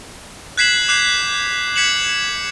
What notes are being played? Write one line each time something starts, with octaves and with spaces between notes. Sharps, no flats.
F#6 G#6 B6 C7 E7 F#7
D6 F#6 G6 C7 E7
G#6 B6 C#7 E7 F#7